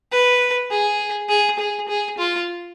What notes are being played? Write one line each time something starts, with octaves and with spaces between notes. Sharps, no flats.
B4
G#4
G#4
G#4
G#4
F4